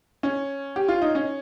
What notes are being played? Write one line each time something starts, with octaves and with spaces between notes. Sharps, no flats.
C#4
G4
F4
D#4
C#4